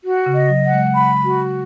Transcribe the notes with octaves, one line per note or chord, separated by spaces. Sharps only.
F#4
C#3
D#5
F#3
F#5
G#3
B5
F#4